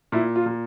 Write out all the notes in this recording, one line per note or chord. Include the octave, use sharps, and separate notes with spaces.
A#2 E4
F4
A#2